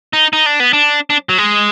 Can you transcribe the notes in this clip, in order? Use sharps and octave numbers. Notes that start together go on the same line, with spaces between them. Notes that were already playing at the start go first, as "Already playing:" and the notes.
D#4
D#4
D4
B3
D4
D4
F#3
G#3